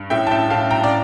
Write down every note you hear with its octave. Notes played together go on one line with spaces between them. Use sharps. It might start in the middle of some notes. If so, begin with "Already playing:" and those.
Already playing: G2
A2 E5 G5
A5
E5 G5
A2 F5 A5
G5 A#5
D5